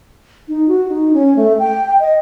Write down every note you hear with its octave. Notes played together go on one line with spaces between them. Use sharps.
D#4
F#4
D#4
C#4
A3
G5
D#5